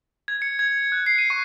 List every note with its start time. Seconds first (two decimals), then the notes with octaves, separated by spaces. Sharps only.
0.28 G#6
0.42 C#7
0.59 G#6
0.92 F#6
1.06 C7
1.18 D#7
1.30 C#6